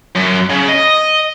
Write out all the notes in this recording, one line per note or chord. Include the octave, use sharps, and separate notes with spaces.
F#2
C#3
D#5